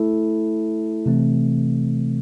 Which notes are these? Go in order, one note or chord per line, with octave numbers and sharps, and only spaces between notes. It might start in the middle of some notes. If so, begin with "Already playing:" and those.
Already playing: A3 E4 A4
C3 E3 A3 C4